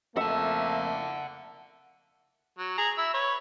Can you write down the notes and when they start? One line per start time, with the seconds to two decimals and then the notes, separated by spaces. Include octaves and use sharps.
0.17 F2 A3 A#3 E5 F#5 A5
2.59 F#3
2.77 G#4 A#5
2.98 E4 E6
3.14 B4 C#5